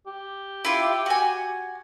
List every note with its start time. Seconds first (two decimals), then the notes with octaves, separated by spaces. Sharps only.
0.07 G4
0.65 E4 F4
1.06 F#4 G#5